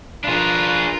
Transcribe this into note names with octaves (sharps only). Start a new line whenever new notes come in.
D4 F4 G#4 A#4 B4